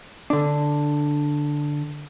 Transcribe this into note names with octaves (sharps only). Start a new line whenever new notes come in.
D3 D4